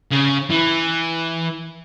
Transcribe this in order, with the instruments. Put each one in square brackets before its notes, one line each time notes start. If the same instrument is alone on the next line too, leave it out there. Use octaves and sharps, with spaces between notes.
[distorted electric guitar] C#3
E3